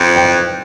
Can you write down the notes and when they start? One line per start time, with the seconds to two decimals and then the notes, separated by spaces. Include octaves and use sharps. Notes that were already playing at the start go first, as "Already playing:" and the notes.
Already playing: F2 G5
0.16 G5